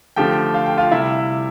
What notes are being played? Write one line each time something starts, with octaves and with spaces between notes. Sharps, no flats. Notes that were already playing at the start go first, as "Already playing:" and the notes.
D3 F3 A3 G4 G5
F5
G5
F4 F5
C3 G3 E4 E5